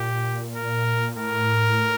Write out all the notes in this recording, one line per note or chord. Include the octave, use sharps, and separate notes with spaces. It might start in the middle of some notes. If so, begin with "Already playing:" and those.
Already playing: A#2 G4
A#4
A2 A#4